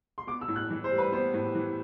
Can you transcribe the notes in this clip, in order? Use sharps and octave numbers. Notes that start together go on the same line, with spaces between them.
C6
B3 D6
E6
A2
F#6
E3
C5
G3
B4
B3 C5
A2
E3